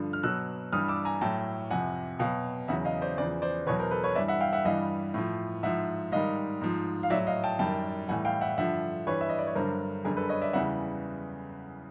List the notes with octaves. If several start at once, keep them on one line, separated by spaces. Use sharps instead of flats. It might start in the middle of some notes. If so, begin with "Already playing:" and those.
Already playing: G2 D3 F3
F6
B2 F#3 E6 F#6
G2 E3 G3 D#6 F6
D6 E6
G#5 A#5
A2 F#3 G5 A5
F2 C3 F3 F#5 G#5
B2 F#3 F5 G5
E2 C#3 F#3 E5 F#5
D#5 F5
C5 D5
E2 C#3 F3 C5 D5
C5 D5
E2 B2 F#3 B4 C#5
A#4 C5
A4 B4
B4 C#5
G2 E3 G3 D5 E5
E5 F#5
F5 G5
E5 F#5
G2 E3 G3 D#5 F5
A2 F3
G#2 F3 E5 F#5
G#2 D#3 G3 D#5 F5
G#2 F3
F5
A2 F#3 D5 E5
D#5 F5
G5 A5
F#2 D#3 G3 G5 A5
A2 E3 G3 F#5 G#5
F5 G5
E5 F#5
G2 D3 F3 E5 F#5
G2 E3 G3 B4 C#5
E5
D#5
D5
C#5
G2 D3 F#3 A#4 C5
F#2 D3 G3 G#4 A#4
A4 B4
C#5 D#5
D5 E5
E2 C#3 E3 G3 E5 F#5